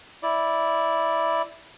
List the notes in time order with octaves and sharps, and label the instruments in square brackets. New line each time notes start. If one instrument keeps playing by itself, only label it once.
[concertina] E4 D5